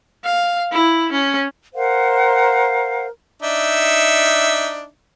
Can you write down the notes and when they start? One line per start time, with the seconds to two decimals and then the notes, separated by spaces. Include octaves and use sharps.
0.24 F5
0.72 E4
1.12 C#4
1.74 A#4 C5 F5 F#5
3.42 D4 D#4 E5